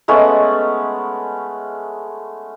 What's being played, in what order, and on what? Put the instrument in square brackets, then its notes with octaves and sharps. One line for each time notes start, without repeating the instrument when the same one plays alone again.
[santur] G#3 A3 B3 C#4